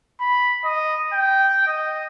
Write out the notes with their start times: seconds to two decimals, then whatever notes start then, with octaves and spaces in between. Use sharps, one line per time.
0.20 B5
0.65 D#5
1.13 G5
1.67 D#5